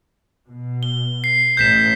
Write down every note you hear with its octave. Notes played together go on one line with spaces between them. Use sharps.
B2
G7
C7
A1 G6 B6 E7